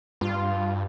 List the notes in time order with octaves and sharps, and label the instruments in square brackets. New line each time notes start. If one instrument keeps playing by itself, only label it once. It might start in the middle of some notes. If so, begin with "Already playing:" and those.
[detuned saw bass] G2 [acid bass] F4